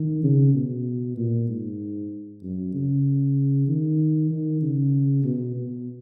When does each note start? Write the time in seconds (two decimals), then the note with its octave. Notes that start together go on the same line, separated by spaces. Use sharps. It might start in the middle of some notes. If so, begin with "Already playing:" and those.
Already playing: D#3
0.24 C#3
0.55 B2
1.18 A#2
1.49 G#2
2.43 F#2
2.74 C#3
3.68 D#3
4.31 D#3
4.62 C#3
5.24 B2
5.56 B2